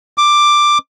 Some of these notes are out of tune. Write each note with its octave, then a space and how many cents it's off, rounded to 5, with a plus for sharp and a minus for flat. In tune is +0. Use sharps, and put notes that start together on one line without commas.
D6 +10